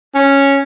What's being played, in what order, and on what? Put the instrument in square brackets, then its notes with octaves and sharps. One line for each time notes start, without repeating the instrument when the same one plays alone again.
[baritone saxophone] C#4